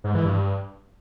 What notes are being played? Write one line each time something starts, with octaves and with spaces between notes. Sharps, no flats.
G#2
E3
G2